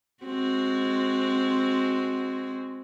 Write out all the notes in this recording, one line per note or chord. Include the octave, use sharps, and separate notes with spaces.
G#3 C4 F#4